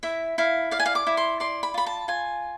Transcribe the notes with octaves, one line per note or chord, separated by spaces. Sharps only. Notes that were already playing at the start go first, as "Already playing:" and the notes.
E4 E5
E4 F5
D5 F5
G#5
F5
D6
E4
C6
D5 C6
B5
F4 B5
A5
F4 G#5